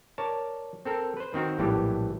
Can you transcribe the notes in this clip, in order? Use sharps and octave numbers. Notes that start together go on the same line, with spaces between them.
A#4 C#5 D5 A5
C4 A4 A#4
B4 C5
D#3 C4 F#4 A#4
A#1 A2 E3 F#3 G3 G4